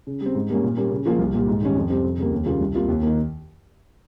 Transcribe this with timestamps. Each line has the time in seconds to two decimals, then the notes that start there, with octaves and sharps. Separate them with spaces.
0.07 C#3
0.21 G3
0.26 C4
0.35 G#2
0.50 G3 A#3 C#4
0.64 A#2
0.77 G3 A#3 C#4
0.91 C#3
1.06 F3 A#3 F4 G#4
1.19 C2
1.34 A#2 G3
1.48 G#2
1.62 D#3 G3 C#4
1.76 F2
1.90 C3 G3 C4
2.04 F2
2.18 C#3 G3 A#3
2.31 D#2
2.46 C#3 G3 A#3 F4
2.61 C2
2.74 C3 G3 A#3 F4
2.88 D#2
3.02 D#3 A#3